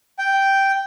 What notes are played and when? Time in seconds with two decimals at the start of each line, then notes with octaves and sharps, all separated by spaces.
0.19 G5